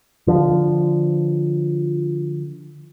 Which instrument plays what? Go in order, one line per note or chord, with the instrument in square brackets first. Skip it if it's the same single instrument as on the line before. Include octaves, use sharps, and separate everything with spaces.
[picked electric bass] D3 F3